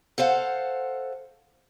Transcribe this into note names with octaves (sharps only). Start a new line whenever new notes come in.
A4 C5 F5 F#5